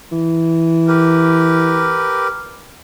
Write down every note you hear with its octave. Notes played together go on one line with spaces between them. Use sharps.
E3
G4 A#4 B4